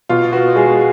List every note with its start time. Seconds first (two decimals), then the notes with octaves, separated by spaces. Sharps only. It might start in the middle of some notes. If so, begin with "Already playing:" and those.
0.09 B2 F4
0.33 B3 F#4
0.56 G#3 G#4